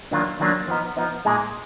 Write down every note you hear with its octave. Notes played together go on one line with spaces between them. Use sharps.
D#3 F#3 A#3 D4 F4
D#3 F#3 A#3 D4 F4
F3 B3 D#4
F3 B3 D#4
A#2 G#3 D#4 G#4